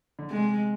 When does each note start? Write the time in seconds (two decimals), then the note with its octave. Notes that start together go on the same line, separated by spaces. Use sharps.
0.19 D3
0.30 C3 G#3